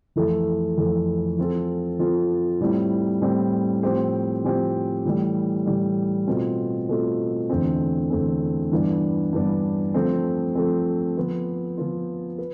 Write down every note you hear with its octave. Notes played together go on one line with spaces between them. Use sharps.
F2 E3 A3 E4 A4
F2 E3 A3 E4 A4
F3 C4 F4 A4
F3 C4 F4 A4
A2 G3 C4 E4
A2 G3 C4 E4
A2 F3 C4 G4 C5
A2 F3 C4 G4 C5
A2 E3 G3
A2 E3 G3
B2 A3 C4 F4
B2 A3 C4 F4
E2 D3 A3 C4
E2 D3 A3 C4
G2 E3 B3 D4
G2 E3 B3 D4
F3 A3 C4
F3 A3 C4
F3 B3 F4
F3 B3 F4
B4